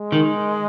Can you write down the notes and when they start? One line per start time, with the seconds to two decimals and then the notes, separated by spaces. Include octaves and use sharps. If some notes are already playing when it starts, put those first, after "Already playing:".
Already playing: G#3
0.12 D#3